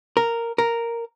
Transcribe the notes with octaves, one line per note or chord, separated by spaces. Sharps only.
A#4
A#4